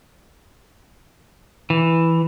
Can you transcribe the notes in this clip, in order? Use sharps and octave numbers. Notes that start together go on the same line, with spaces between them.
E3